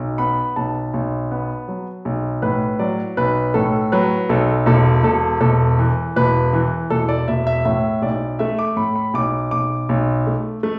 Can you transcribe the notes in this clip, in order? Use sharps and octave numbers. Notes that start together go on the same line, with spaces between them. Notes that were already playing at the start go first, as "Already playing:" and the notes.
Already playing: B1
B3 B5
B1 A5
B1
B3
F#3
B1
A2 B4
F#3 D5
B1 B4
A2 A4
F#3 B4
B1 A4
E1 A4
E1 A4
E1 A4
E3
E1 B4
E3
E1 A4
D5
E1 E5
E5
A2 E5
B1 D5
A3 E5
D6
A2 B5
B5
B1 D6
B1 D6
B1
A3
A3